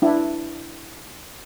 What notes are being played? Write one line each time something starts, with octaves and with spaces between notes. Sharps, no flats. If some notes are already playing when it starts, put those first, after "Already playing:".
D4 E4